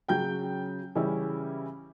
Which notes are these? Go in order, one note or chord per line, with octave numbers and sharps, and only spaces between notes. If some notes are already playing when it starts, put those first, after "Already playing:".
C#3 F#3 C#4 G5 G6
C#3 E3 G3 C#4 E4